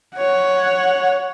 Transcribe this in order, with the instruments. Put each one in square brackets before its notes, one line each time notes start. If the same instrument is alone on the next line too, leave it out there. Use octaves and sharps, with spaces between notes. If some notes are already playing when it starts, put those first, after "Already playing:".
[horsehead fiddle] C#5 F#5